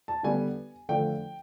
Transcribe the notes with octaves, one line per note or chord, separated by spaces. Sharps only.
A5
D3 G3 B3 G#5
D3 F3 A3 G5